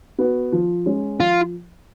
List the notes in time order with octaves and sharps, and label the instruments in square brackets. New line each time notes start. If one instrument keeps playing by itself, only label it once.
[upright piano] B3 F#4
F3
G#3 C#4
[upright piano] F3 [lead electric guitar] F4